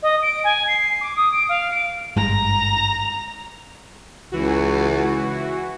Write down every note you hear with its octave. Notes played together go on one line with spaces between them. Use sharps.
D#5
D7
G#5
C7
D6
D#6
D7
F5
D7
G#1 G2 G#3 A#5
C#2 E3 F#4